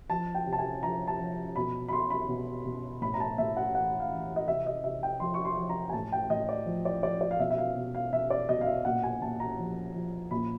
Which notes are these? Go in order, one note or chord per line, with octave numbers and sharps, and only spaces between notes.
F3 A5
G5
C3
A5
G#5
F3 A#5
A5
F3
B2 B5
B5
B2 C6
B5
B2
B2
A2 B5
A#5
A5
A2 E5
F#5
E3 F#5
F5
E3
D#5
C3 E5
D#5
C3 E5
G5
F3 C6
C#6
C6
F3
A#5
G#5
A2 A5
G5
A2 D#5
D5
F3
D5
F3 D5
D5
F5
B2 E5
E5
F5
B2
F5
B2 E5
D5
B2 D#5
F5
E5
A#2 F#5
G#5
A#2 A5
A#5
F3
F3
A#2 B5